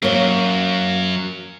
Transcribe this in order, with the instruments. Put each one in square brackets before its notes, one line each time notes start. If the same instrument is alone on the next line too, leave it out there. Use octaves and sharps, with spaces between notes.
[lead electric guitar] F#2 F#3 [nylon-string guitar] A#3 C#5